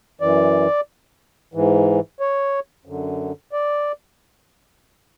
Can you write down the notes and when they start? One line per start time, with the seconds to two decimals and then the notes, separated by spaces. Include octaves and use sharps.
0.21 F#2 E3 D5
1.54 G#2 E3
2.20 C#5
2.85 F#2 D3
3.52 D5